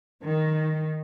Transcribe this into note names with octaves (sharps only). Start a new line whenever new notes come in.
D#3